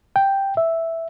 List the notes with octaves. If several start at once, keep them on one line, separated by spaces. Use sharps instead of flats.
G5
E5